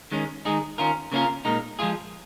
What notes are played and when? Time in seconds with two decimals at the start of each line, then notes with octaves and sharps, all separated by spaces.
0.11 D#3 G#3 C#4
0.45 D#3 G#3 D#4 G#4
0.78 D#3 C#4 F4 A#4
1.12 C#3 A#3 C#4 F4 A#4
1.45 A#2 G#3 D#4 A#4
1.79 F3 G#3 F4 G#4